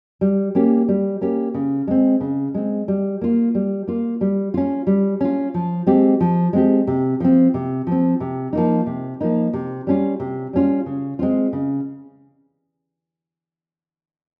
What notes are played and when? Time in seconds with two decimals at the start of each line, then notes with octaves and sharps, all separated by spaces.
0.21 G3
0.55 A#3 C#4 G4
0.88 G3
1.21 A#3 C#4 G4
1.54 C#3
1.87 G#3 C4
2.21 C#3
2.54 G#3 C4
2.88 G3
3.21 A#3 F4
3.55 G3
3.87 A#3 F4
4.21 G3
4.54 C#4 F4
4.87 G3
5.20 C#4 F4
5.54 F3
5.87 G#3 C4 G4
6.20 F3
6.53 G#3 C4 G4
6.87 C3
7.20 F3 C4
7.54 C3
7.87 F3 C4
8.20 C3
8.53 F3 A#3 D#4
8.86 C3
9.20 F3 A#3 D#4
9.53 C3
9.87 G3 C#4 F4
10.20 C3
10.53 G3 C#4 F4
10.86 C#3
11.19 G#3 C4 F4
11.53 C#3